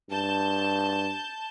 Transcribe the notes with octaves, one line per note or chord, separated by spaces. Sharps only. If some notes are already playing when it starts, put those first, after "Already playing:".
G2 A5 G6